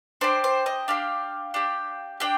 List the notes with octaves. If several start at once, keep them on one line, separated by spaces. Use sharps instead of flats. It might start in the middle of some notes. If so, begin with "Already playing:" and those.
D4 G4 C5
C5
D#5
D4 G4 F5
D4 G4
D4 G4 G5